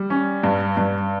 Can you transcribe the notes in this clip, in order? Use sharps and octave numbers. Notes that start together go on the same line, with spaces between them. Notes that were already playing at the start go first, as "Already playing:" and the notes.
Already playing: G3
C#4
G2
G2